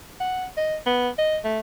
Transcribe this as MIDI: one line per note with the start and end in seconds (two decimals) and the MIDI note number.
0.20 0.45 78
0.57 0.76 75
0.86 1.09 59
1.18 1.38 75
1.44 1.60 57